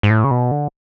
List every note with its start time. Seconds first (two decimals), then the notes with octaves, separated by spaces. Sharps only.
0.03 G#2
0.10 A2
0.24 C#3
0.31 B2
0.51 D3